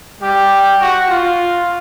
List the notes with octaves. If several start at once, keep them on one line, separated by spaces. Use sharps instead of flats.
G3 G4
F#4
F4